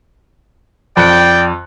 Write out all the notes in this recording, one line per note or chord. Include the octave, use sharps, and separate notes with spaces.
F2 D5 G5 F#6 C#7